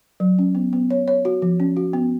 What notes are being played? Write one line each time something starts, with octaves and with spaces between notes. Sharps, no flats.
F#3
C#4
B3
B3
C#5
C#5
F#4
F3
C#4
F#4
B3